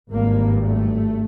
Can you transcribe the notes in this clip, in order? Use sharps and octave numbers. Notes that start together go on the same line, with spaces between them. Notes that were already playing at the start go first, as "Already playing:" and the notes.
G#1 G2 A#3
A3